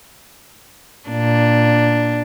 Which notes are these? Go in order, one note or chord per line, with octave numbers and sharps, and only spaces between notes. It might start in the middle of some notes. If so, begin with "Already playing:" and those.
A#2 D4